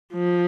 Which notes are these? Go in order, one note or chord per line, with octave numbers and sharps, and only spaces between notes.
F3